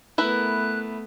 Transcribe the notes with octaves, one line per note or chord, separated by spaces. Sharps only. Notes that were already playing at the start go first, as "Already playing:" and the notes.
A3 B3 E4 A#4 B4 F#6